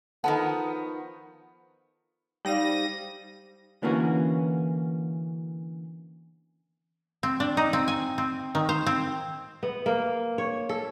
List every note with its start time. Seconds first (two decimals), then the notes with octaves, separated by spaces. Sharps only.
0.24 D#3 F3 B3 A4 F#5 A5
2.45 G3 D#4 C5 F5 A#6 D#7
3.82 D3 E3 A#3 B3 C#4 F#4
7.23 C4
7.40 D4
7.57 D#4
7.73 C4
7.88 G#5
8.18 C4
8.55 D#3
8.69 C5
8.86 C4
9.63 B3
9.86 A#3
10.38 C#5
10.69 A4